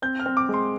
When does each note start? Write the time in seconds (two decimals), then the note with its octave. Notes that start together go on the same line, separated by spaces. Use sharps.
0.02 C4 G6
0.20 F6
0.26 C4
0.37 D6
0.49 G#3 C6